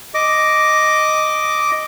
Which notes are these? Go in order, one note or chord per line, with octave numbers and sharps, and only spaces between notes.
D#5 D6